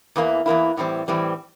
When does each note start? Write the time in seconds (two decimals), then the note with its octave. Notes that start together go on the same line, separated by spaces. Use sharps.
0.16 E2 E3 A#3 E4
0.46 E2 E3 A#3 E4
0.77 A2 E3 G3 C4
1.08 A2 E3 G3 C4